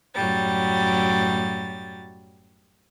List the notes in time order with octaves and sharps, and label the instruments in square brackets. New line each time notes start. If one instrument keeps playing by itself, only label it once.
[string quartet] F#2 A2 F#3 G3 A6